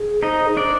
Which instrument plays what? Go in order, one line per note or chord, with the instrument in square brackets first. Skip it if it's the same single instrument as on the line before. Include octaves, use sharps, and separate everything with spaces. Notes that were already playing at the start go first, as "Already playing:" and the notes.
Already playing: [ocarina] G#4
[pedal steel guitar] D#4 D#5 [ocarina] C5
[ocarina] G#4
[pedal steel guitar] D4 D5 [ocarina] C5